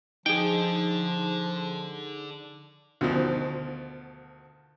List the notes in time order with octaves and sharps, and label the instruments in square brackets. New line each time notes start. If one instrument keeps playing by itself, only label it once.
[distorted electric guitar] D3 [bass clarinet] F3 [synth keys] D#4 G#4 [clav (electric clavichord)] G5
[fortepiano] D2 B2 D#3 F3